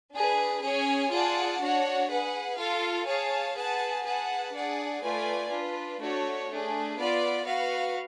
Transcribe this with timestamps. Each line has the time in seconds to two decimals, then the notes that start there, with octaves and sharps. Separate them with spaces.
0.13 D4 G#4 B4
0.63 C#4 G#4 C#5 G#5
1.11 F4 G#4 D5 F#5 A5
1.60 D4 F#4 C#5 F#5
2.09 G#4 B4 F#5
2.58 F4 A4 F5
3.06 G#4 C#5 F5 A5
3.55 G#4 B4 F#5 A5
4.04 G#4 B4 F#5 A5
4.53 D4 G#4 D5 F#5
5.03 A3 F4 B4 D5 G#5
5.51 D4 F4 B4
6.00 A3 D4 F#4 C#5
6.49 A3 D4 G#4
6.98 B3 F4 B4 D5
7.46 F#4 B4 F5